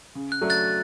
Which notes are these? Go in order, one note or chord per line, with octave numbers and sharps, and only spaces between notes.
C#3
F#6
F#3 A3 D4
F#6 A6